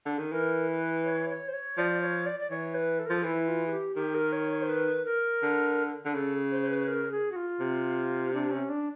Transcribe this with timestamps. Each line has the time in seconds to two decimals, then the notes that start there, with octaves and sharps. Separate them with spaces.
0.06 D3
0.18 D#3
0.32 E3 A#4
0.68 B4
1.05 C#5
1.30 C#5
1.48 C5
1.53 C#5
1.77 F3 D5
2.02 C#5
2.26 D5
2.40 D5
2.50 E3 C#5
2.74 B4
2.99 A4
3.06 A#4
3.10 F3 A4
3.23 E3 E4
3.48 F4
3.68 G#4
3.71 G4
3.96 D#3 G4
4.15 A#4
4.32 C#5
4.51 C#5
4.62 C5
4.69 B4
5.05 A#4
5.42 D3
6.05 D3
6.14 C#3 A4
6.52 C5
6.62 C5
6.70 B4
6.88 A#4
7.12 G#4
7.32 F#4
7.36 F4
7.60 C3
8.33 D4
8.51 C#4
8.69 D4